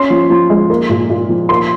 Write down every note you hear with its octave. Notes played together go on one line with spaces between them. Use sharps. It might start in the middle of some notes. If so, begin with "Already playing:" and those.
Already playing: C#4 C6
F3
F3
G#3
A#3
A#2
A#2
F3
A#3 C6